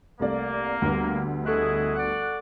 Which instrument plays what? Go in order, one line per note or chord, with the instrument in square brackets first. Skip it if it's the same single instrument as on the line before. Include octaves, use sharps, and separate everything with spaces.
[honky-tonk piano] C2 A3 D5 [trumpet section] A#3
[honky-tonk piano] D2 G3 B3
[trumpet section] E4 G#4 D#5 [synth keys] A4 C#6 F#6
[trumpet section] D5 F#5